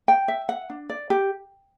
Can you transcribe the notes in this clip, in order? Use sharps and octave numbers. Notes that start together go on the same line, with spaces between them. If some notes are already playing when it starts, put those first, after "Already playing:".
G5
E5
F#5
D4
D5
G4